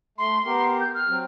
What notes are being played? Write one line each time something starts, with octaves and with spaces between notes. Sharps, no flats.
A3 C6
B3 G4 A#4
G6
F6
F#3 C4